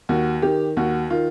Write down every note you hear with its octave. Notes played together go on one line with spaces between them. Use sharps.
D#2 F#4
D#3 G4
D#2 F#4
D#3 F4